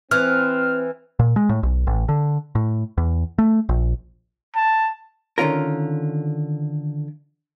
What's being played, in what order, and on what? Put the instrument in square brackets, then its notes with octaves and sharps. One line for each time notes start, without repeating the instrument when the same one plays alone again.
[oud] E3 [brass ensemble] C4 [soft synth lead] F6
[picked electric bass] A#2
G#3
A2
B1
A1
D3
A2
E2
A3
A#1
[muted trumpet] A5
[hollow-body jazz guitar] D3 D#3 C#4 F4 A#4